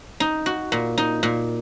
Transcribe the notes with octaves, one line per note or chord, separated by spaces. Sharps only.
D#4
F#4
A#2
D#4
A#2